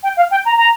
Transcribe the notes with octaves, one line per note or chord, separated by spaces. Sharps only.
G5
F5
G5
A#5
A#5